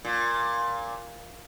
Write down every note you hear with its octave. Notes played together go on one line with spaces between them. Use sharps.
A#2